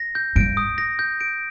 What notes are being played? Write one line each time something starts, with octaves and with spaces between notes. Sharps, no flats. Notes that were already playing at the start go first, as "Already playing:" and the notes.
Already playing: A#6
G6
G2 D7
D#6
A#6
G6
D7